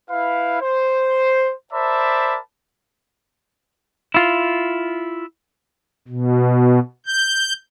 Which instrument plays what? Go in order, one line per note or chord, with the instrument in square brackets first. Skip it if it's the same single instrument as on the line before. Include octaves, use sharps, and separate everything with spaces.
[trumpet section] E4 B4 F5
C5
A#4 C5 D5 E5 A5 B5
[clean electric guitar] E4 F4
[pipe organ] B2
G6